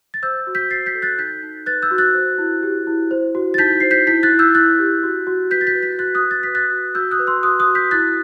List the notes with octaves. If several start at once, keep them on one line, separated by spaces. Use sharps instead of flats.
A6
C5 E6 G6
F#4
G6 B6
C5 A6 C7
G6 B6
A4
F#6 A6
D#4 G6 B6
D#4
B4 F#6 A6
E6 G6
F#4
F#6 A6
C5
E4
G4
E4
C5
F#4
A6
D#4 G6 B6
C5 C7
G6 B6
E4 G6 B6
F#6 A6
E4
E6 G6
E4 F#6 A6
G4
F#4
F#4
B4 G6 B6
A6
G6 B6
B4
G6 B6
F#4 F#6 A6
D#6 F#6
F#4
A6
B4 B6
F#6 A6
F#4
F#4 E6 G6
D#6 F#6
B4
C6 E6
F#4 D#6 F#6
D#6 F#6
F#4
G6 B6
E4 F#6 A6